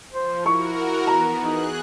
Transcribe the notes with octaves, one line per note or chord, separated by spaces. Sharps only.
F3 C5
E4 F#4 A#4 C#6
E3 B3 A#5
D#4 G#4 F#6